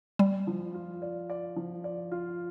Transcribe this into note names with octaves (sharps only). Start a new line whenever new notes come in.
G3 D5
F3
F4
D5
D5
F3
D5
F4